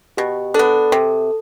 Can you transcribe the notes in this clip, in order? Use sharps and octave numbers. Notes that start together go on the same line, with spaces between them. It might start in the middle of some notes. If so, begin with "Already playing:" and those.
B2 G4
B3 D4 A4
C3